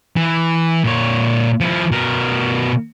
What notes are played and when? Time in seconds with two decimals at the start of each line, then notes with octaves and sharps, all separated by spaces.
0.16 E3
0.84 A#2 C#5
1.61 F3 E4
1.92 B2 A#4